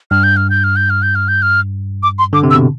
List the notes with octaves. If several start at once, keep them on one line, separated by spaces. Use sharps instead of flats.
G2 F6
G6
F6
G6
F6
G6
F6
G6
F6
G6
F6
D6
C6
D3 D6
C3
E6
B2